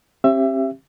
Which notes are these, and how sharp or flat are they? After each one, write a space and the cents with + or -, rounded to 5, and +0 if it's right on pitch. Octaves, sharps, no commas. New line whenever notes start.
C4 +40 G4 +0 E5 +25